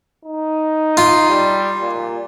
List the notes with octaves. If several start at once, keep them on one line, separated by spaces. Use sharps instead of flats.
D#4
F4
G3
A#2